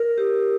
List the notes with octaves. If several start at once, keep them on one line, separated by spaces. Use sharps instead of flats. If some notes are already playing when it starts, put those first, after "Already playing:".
Already playing: A#4
G4